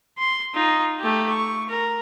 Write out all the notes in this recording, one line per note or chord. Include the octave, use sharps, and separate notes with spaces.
C6
D#4 F4
A3 G4
C#6
A#4